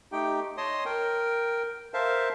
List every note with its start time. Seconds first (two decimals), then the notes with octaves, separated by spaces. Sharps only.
0.12 A3 D#4 G4 G5
0.57 C#5 D#5 A5 C6 D#6
0.85 A#4 G5
1.94 A#4 C5 E5 F5 A5